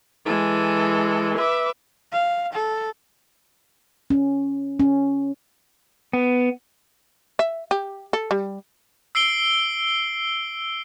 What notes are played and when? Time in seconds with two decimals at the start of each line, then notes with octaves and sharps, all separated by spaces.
0.25 E3 G#3 A4
1.36 B4 E5 D6
2.12 F5
2.53 A4
4.10 C#4
4.80 C#4
6.13 B3
7.39 E5
7.71 G4
8.13 A4
8.31 G3
9.15 E6 C7 D7 G7